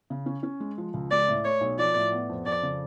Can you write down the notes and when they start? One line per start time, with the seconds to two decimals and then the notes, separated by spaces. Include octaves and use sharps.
0.10 C#3
0.26 C#4
0.43 C#4
0.60 G#3
0.78 F3
0.94 C#2
1.11 G#3 D5
1.28 A2
1.44 A3 C#5
1.61 B1
1.78 F3 D5
1.95 A2
2.12 B3
2.29 F2
2.46 F2 D5
2.63 C#3